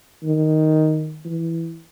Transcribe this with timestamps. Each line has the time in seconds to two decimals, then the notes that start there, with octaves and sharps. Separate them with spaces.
0.24 D#3
1.25 E3